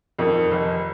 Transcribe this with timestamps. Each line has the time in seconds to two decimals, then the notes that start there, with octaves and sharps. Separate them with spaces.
0.19 F2 D#3
0.51 F1